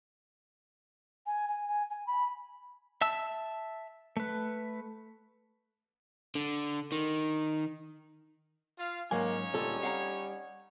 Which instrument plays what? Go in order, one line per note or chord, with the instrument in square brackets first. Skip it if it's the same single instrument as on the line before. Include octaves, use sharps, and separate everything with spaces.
[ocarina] G#5
G#5
G#5
G#5
B5
[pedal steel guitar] E5 A5 E6
A3 B4
[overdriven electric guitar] D3
D#3
[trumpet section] F4 F5
[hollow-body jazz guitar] G#2 F#3 G#5 [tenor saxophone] A#3 [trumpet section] C#4 D#4 C#5
[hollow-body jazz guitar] D2 A#2 A4 [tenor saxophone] G3
[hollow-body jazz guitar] F5 F#5 A#5